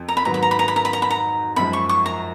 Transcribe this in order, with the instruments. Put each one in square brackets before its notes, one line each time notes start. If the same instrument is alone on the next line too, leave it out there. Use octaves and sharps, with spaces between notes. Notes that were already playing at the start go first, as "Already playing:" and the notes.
Already playing: [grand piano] F2 F3
[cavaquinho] A#5
B5
[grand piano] G#2 D#3 F#3 B3 F#4 [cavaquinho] A#5
[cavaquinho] B5
A#5
B5
A#5
B5
A#5
B5
A#5
B5
A#5
[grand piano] F#2 F3 G#3 [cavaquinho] B5
[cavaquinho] C#6
C#6
A#5